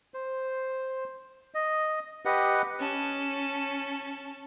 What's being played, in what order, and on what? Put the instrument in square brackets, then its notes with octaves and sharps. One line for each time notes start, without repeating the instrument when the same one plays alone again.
[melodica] C5
D#5
G4 B4 D#5 F#5
[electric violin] C#4 A5